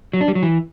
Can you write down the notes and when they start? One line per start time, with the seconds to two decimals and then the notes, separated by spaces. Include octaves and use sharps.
0.13 F#3
0.21 D4
0.28 G3
0.35 F#3
0.43 E3